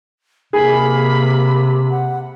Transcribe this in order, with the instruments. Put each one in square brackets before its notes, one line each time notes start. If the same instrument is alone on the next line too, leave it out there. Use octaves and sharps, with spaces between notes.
[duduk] C3 [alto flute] A#3 [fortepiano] G#4 [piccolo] B5
[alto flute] F#5